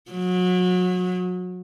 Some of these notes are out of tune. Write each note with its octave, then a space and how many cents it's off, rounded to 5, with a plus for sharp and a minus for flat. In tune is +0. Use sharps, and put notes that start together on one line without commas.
F#3 -30